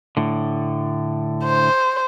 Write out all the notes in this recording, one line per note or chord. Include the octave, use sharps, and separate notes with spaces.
A2 D3
C5